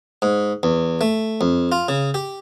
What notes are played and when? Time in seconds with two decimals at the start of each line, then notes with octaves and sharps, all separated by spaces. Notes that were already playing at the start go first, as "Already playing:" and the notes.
0.22 G#2
0.63 E2
1.01 A3
1.41 F2
1.72 F4
1.88 C#3
2.14 G4